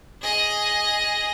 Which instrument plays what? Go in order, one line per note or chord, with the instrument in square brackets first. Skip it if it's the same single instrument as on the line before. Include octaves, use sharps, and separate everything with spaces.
[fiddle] G#4 D#5